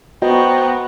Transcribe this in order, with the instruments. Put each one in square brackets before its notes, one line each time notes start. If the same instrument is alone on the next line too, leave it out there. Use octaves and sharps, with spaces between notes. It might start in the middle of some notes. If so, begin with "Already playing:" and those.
[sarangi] B3 [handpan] F#4 [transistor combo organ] C5 G5 A#5 [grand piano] D#5